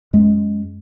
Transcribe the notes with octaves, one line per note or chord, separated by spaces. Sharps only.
F#2 G#3